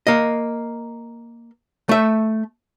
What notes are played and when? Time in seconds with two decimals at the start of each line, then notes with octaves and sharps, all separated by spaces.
0.07 A#3 D#5
1.89 A3 E5